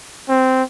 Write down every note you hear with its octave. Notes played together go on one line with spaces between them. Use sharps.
C4